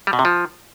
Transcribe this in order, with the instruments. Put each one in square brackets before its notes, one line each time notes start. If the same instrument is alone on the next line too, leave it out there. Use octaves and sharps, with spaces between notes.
[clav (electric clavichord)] G3
B2
C3
F3